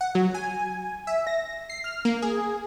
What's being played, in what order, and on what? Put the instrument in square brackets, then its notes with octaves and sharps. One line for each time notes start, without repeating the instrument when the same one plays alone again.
[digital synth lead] F#5
F#3
G#5
E5
A#6
C7
F6
A#3
G#4